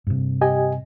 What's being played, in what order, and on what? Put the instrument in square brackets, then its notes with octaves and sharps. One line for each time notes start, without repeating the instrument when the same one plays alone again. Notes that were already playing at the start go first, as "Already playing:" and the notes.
[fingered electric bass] G2 C3
[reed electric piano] G4 D#5 G#5